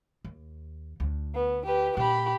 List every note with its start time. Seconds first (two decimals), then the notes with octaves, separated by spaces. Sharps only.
0.25 D#2
1.00 D2
1.34 B3
1.66 G4 B4
1.97 A#2 G4 B5